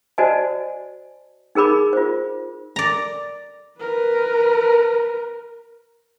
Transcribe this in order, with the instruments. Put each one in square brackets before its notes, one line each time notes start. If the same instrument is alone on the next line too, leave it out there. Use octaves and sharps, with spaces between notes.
[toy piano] F#4 C5 D5 D#5 G#5 A5
D#4 G#4 A#4 B5 D6
F4 C5
[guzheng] D5 A#5
[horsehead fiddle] A#4 B4